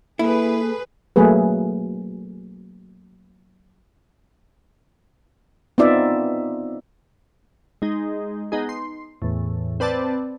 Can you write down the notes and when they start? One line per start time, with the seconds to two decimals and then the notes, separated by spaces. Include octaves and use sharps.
0.19 A#3 E4 G#4 A4 B4
1.16 F#3 A3 A#3 G#4 B4
5.78 B3 C4 D#4 F4 D5 E5
7.82 G#3 D#4
8.52 B3 D#4 G#4
8.69 C6
9.22 E2 A2
9.80 C4 B4 D5 A5